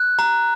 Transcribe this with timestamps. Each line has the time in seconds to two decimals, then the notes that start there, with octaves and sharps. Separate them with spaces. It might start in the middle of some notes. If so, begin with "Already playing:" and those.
Already playing: F#6
0.19 A#5